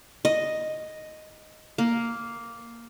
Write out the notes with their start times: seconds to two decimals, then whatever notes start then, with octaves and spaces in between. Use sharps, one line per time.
0.25 D#5
1.78 A#3